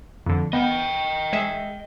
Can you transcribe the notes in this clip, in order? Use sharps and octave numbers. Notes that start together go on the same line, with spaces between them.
F2 D3
B3 D#5 G5
G#3 G#4 E5